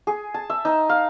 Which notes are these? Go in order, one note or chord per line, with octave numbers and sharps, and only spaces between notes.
G#4
A5
E5
D#4
F5